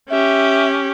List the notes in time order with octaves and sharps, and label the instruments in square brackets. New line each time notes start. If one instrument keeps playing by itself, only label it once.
[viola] C#4 G4 [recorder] E5